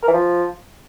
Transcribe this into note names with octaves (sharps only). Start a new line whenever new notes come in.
A#4
E3
F3